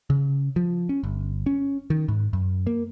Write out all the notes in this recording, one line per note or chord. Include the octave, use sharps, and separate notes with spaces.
C#3
F3
C#4
G1
C#4
D#3
G#2
F#2
A#3